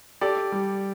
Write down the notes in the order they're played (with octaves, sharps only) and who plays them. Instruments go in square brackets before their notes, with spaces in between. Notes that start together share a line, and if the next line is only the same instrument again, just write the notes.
[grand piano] G4 [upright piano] A4 D5
[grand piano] G3